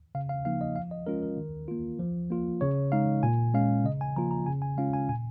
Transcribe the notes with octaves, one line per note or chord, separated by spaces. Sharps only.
C#3 F5
F5
F3 A#3 D#4 F5
D#5
F3 F5
D#5
G#3 C#4 F4 A#4
A#4
D#3
A#3 F4
F3
A#3 F4
C#3 C#5
G#3 D#4 F5
A#2 G#5
G#3 C#4 F5
C#3 D#5
G#5
F3 A#3 F4 A#5
A#5
C#3 G#5
G#5
G#3 C#4 F4 F5
G#5
A#2 G#5